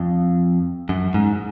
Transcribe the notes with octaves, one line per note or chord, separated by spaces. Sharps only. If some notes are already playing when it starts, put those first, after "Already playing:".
Already playing: F2
F#2
G#2